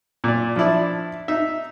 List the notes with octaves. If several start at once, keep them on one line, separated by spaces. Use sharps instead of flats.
A#2 D5
F3 D4 E4 D5
D#4 E5